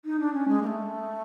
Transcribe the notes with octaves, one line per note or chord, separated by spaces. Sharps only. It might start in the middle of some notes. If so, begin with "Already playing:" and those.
D#4
D4
C#4
G#3
A#3
A3